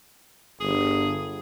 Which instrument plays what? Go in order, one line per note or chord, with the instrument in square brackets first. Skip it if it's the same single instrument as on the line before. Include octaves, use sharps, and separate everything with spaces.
[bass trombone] G1 [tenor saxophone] G#4